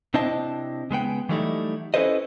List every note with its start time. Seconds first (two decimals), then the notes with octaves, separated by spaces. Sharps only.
0.14 C3 C4 D4 E4 D#5 A5
0.91 C#3 G#3 B3 G5
1.29 E3 F#3 G3 A3 D#4 E4
1.94 C#4 E4 A4 B4 C5 D#5